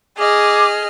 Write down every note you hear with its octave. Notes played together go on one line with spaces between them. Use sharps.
G#4 D#5 D6 F6